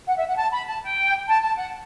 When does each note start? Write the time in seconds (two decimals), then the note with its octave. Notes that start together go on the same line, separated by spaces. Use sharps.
0.07 F#5
0.17 E5
0.27 F#5
0.36 A5
0.51 B5
0.67 A5
0.82 G5
1.27 A5
1.41 A5
1.56 F#5